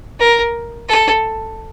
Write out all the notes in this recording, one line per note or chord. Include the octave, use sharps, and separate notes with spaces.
A#4
A4